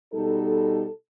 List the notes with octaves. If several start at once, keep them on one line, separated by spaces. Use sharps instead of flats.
B2 G3 D#4 A4